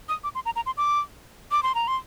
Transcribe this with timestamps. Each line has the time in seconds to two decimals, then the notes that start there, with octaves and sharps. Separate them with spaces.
0.09 D#6
0.24 D6
0.35 C6
0.45 A#5
0.56 A#5
0.66 C6
0.77 D6
1.51 D6
1.63 C6
1.75 A#5
1.88 C6